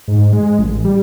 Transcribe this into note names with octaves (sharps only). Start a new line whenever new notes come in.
G#2
G#3
A1
G3